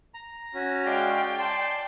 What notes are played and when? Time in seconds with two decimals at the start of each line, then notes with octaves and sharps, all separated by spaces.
0.14 A#5
0.54 C#4 F#4
0.86 G#3 D5 F5 G5
1.39 D5 A5 C6